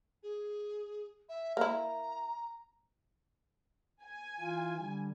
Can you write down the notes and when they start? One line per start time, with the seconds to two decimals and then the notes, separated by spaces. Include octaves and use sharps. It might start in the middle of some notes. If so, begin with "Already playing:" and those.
0.23 G#4
1.29 E5
1.57 A#3 E4 A#5
4.03 G#5
4.40 E3 F4
4.77 D3 G3